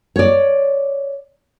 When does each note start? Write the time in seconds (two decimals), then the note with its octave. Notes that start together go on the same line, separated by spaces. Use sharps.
0.16 C#5 D5